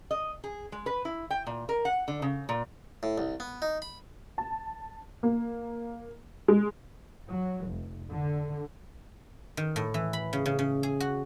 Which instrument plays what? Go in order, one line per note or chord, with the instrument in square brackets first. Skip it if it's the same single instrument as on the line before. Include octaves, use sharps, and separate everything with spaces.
[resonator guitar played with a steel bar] D#5
G#4
G#3
B4
E4
G5
A#2
A#4
F#5
D3
C#3
A#2
[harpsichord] A2
C2
B3
D#4
B5
[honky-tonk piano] A5
A#3
G#3
[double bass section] F#3
F1
D3
[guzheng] D#3
A2
E3
B5
C#3
C#3
C#3
G#4
F#4